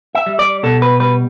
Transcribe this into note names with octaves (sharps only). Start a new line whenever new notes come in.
E5
G3
D5
B2 A4
B4
G3 B4